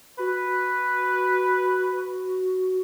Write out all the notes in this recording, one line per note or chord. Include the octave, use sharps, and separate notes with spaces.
F#4 B4